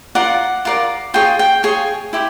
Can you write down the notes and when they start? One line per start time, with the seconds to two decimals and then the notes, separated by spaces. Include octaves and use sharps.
0.15 F4 A#4 D5 F#5
0.65 F4 A#4 D5
1.14 F4 G#4 C#5 G5
1.39 G5
1.63 F4 G#4 C#5 G#5
2.13 E4 G4 C5